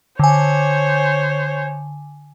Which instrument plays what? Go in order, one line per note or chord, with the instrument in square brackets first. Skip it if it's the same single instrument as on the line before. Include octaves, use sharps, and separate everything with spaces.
[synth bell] D3 G#5 [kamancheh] C5 C#5